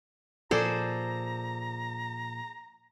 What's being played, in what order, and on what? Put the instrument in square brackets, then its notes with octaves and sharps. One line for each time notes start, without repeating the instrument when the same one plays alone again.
[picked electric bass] A#2 F3 [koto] G#4 A4 D5 [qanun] C5 [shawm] A#5